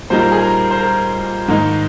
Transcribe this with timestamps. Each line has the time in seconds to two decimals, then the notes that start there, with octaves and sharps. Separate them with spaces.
0.10 A#2 G3 A#3 D#4 C5
0.21 A#4
0.32 G#4
0.42 A#4
0.71 C5
0.79 A#4
1.48 G#2 D#3 A#3 D#4